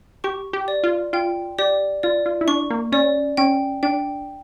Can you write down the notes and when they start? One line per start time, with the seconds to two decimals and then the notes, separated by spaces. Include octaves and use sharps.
0.24 G4 C#6
0.53 G4
0.68 D5
0.84 F4
1.13 F4 G5
1.59 G4 D5
2.03 F4 D5
2.26 F4
2.41 E4
2.48 D4 C#6
2.70 A#3
2.92 C#4 D5
3.37 C#4 G5
3.83 D4 G5